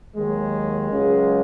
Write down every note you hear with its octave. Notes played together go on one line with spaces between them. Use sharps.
D#2 D#3 F#3 G#3
C#2 C#3 F#3